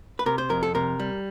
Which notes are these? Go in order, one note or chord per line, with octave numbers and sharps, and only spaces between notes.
B4
C3 A#4
C5
F2 A#4
A4
C3 A#4
G3